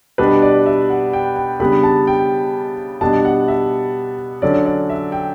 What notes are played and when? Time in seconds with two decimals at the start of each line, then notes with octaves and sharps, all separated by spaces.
0.18 B2 G3 D4 B4
0.42 D5
0.66 E5
0.90 F#5
1.13 G5
1.36 G5
1.60 C#3 G3 B3 D4 B5
1.83 A5
2.07 G5
3.01 B2 G3 B3 D4 A5
3.25 F#5
3.48 E5
4.42 D3 F#3 C#4 D5
4.66 D5
4.89 E5
5.12 G5